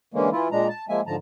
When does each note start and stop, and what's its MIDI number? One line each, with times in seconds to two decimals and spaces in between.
0.14 0.29 50
0.14 0.29 52
0.14 0.29 56
0.14 0.29 58
0.14 0.29 61
0.32 0.48 52
0.32 0.48 64
0.32 0.48 65
0.52 0.68 46
0.52 0.68 56
0.52 0.68 62
0.52 0.68 82
0.68 0.85 81
0.89 1.01 53
0.89 1.01 56
0.89 1.01 58
0.89 1.01 76
0.89 1.01 80
1.07 1.16 44
1.07 1.16 50
1.07 1.16 53
1.07 1.16 81
1.07 1.16 82